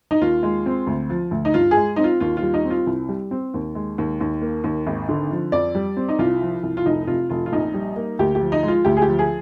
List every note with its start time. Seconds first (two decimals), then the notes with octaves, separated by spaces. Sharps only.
0.11 D#4
0.21 D#2 F4
0.43 G#3
0.66 C4
0.87 D2
1.10 F3
1.31 D2
1.45 D#4
1.54 G2 F4
1.71 G#4
1.77 G#3
1.96 C4 D#4
2.04 F4
2.20 D#2 F4
2.37 F4
2.42 G3
2.54 D#4
2.65 C4
2.70 F4
2.87 C2
3.09 G3
3.31 C4
3.54 D#2
3.75 G#3
3.98 D#2
4.21 D#2
4.42 A#3
4.64 D#2
4.87 G#1
5.09 D3
5.31 F3
5.52 F2 D5
5.75 G3
5.97 C4
6.09 D#4
6.19 C2 F4
6.41 F3
6.63 C2
6.77 F4
6.86 F1 D#4
7.07 C3 F4
7.30 F1 F4
7.46 F4
7.52 A#1 D#4
7.74 G3
7.96 A#3
8.19 D2 G4
8.35 G4
8.40 F3
8.52 D#4
8.63 G#3 F4
8.85 D2 G4
8.97 G#4
9.02 G4
9.08 F3
9.19 G#4